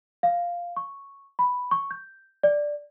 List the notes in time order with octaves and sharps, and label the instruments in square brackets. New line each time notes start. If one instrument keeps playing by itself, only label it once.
[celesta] F5
C#6
B5
C#6
G6
D5